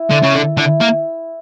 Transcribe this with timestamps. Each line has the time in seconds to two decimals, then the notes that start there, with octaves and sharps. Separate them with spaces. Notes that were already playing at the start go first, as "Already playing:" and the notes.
Already playing: E4
0.11 D3
0.22 C#3 A4 E5
0.34 D3
0.57 D3 E4
0.80 A#3